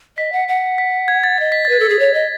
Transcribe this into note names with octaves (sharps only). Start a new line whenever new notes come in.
D#5 B6
F#5
F#5
B6
G#6
A6
D#5 A6
B6
B4 A6
A4
G#4
C#5
D#5